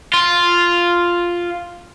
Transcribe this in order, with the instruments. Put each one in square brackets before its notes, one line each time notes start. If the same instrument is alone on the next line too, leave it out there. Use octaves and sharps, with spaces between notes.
[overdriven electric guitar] F4